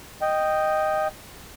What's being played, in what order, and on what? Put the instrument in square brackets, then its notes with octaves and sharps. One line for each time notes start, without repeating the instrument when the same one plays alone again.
[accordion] D#5 G5